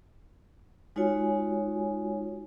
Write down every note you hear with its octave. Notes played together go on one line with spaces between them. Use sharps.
G#3 D#4 F4 F#4 C#5 G#5